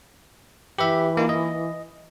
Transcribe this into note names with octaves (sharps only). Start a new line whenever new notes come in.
E3 G4 B4 E5
A#3 D#4 F4
D#5